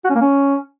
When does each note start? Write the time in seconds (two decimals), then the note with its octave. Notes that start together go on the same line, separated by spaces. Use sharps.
0.04 F#4
0.10 C#4
0.15 A#3
0.21 C#4